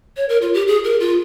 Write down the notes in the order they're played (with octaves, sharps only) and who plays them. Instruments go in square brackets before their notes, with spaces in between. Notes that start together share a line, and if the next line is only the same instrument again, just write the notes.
[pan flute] C#5
A#4
F4
G4
G#4
A#4
F4